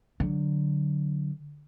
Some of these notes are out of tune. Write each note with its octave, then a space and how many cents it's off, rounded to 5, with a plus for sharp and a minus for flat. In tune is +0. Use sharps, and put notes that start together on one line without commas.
D3 +0 F#3 +0